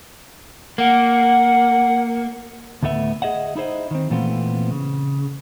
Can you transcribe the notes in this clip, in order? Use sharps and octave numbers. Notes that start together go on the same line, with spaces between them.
A#3 F#5
D2 A2 A3 B3 E5
G#4 D#5 E5 F#5
D#4 E4 G#4 C5 D#5
D#3 C4
A#2 E3 A3 B3 C4 F4
C#3